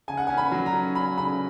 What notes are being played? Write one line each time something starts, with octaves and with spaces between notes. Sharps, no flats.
C#3 G#5
F#5
C#4 G#5
B5
F#3
A#5
C#4
C#4 B5
C#3 B5